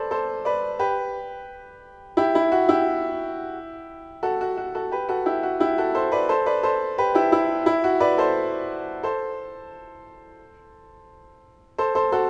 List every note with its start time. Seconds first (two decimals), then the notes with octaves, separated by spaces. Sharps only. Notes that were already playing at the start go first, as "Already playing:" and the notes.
Already playing: A4 B4 C5 D5
0.11 A4 C5
0.45 B4 D5
0.79 G4 B4
2.17 E4 G4
2.35 E4
2.52 F#4
2.69 E4 G4
4.23 F#4 A4
4.41 F#4
4.57 F#4
4.75 F#4 A4
4.92 G4 B4
5.09 F#4 A4
5.26 E4 G4
5.43 F#4
5.60 E4 G4
5.78 F#4 A4
5.95 A4 C5
6.12 B4 D5
6.29 A4 C5
6.46 B4 D5
6.63 A4 C5
6.98 G4 B4
7.15 E4 G4
7.32 E4
7.66 E4
7.84 F#4
8.00 B4 D5
8.18 A4 C5
9.03 A4 C5
11.78 A4 C5
11.95 A4 C5
12.12 F#4 A4